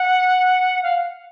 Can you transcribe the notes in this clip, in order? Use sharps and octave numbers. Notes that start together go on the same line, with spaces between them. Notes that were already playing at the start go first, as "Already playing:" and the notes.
Already playing: F#5
F5